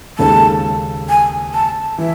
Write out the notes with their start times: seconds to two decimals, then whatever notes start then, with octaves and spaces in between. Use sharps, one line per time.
0.18 D#2 C#3 G#3 D#4 A4 A5
1.09 G#5
1.54 A5
1.98 E3 E5